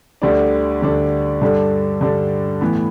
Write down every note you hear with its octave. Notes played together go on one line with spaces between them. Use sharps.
D2 D3 G3 D4
D2 D3 G3 D4
G2 D3 G3 D4 A4
G2 D3 G3 D4 A4
A2 E3 B3